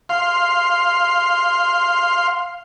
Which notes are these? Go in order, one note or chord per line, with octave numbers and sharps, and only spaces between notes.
F5 C6